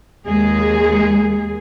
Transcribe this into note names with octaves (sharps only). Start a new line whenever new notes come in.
D#2 G#3 G#4